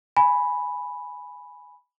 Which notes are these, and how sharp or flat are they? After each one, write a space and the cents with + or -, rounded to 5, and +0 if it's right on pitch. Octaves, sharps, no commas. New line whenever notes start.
G#5 +0 B5 +0